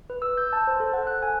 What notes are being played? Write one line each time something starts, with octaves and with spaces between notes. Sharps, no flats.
B4
E6
G6
A5
C5
A4
F#5
F#6
G#5